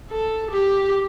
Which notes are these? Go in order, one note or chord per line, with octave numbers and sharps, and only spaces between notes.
A4
G4